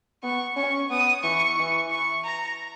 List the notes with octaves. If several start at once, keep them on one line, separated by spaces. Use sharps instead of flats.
B3 C#6
C#4 C#6
B3 D#6
E3 C#6
E3
C#6
A#5